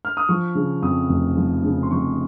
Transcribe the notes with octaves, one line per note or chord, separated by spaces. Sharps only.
F6
D#6
F3 C#6
C#3
F2 D#6
F1
F3
C#3
C6
F2 C#6